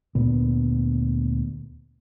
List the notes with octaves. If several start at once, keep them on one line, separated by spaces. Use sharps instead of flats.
D2 A#2 B3